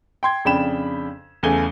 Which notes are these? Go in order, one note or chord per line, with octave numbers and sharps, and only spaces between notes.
G5 C6 G#6
F2 C#3 D4 G5 B5 E7
E2 C#3 A3 G#5 G7